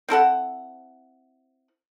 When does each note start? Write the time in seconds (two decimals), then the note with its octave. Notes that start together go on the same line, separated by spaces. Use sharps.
0.09 C4 E4 A4 F#5